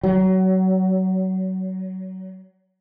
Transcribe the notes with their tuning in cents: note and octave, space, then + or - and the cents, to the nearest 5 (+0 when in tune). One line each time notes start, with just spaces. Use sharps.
F#3 +25